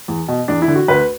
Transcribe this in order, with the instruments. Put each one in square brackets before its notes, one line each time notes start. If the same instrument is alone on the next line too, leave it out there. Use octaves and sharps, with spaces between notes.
[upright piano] E2
B2
E2 D4
E4
D3
F#4
D2 B4